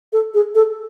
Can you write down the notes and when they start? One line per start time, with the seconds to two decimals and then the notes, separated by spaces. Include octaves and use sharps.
0.13 A4
0.34 G#4
0.55 A4